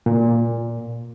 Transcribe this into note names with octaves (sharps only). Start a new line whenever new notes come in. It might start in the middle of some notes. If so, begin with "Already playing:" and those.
A#2